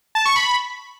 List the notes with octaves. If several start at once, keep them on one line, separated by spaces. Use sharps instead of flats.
A5
C#6
B5